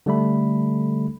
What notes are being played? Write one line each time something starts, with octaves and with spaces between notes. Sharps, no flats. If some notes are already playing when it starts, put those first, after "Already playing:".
D3 G3 A3 B5